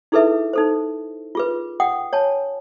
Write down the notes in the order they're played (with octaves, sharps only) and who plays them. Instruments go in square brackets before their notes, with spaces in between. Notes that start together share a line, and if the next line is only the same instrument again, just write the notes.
[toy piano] D#4 E4 G#4 A4 B4 E5
D#4 A4 C5
F4 G#4 B4
F#5 G5 D#6
C#5 G#5 A5